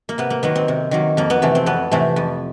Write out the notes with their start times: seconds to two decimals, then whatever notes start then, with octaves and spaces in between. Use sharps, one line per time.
0.09 A#3
0.18 C3 B3
0.30 A#3
0.43 D#3 F#3 A#3 B3
0.56 C4
0.68 C3
0.91 D#3 F#3 A#3
1.17 F2 A#3
1.30 B3
1.42 C3 E3 A3
1.55 C4
1.66 F2 B3
1.92 C3 E3 A3
2.16 F2